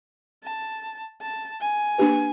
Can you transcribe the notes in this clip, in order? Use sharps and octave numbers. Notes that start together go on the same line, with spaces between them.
A5
A5
G#5
A#3 D4 G4 B4